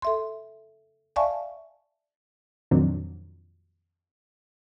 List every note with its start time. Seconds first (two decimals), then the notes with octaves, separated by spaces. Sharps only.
0.02 A4 E5 C6
1.16 D5 E5 F5 G#5 A5 C#6
2.71 F2 A#2 D#3 F#3 C4 D4